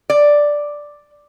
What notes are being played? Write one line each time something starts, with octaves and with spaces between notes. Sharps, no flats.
D5